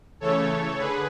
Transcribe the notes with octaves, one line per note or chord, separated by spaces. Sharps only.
C#3 E3 A3 A4 C#5
D3 G#4 B4